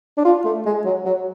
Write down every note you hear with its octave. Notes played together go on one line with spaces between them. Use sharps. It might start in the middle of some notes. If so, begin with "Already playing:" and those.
D4
F4
A3
G#3
F#3
F#3